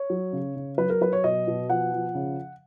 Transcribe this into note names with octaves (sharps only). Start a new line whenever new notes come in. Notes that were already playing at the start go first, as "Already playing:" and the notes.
Already playing: C#5
F#3
C#3
C#3
F#3 B4
A#4
F#3 B4
C#5
B2 D#5
B2
F3 F#5
F3
C#3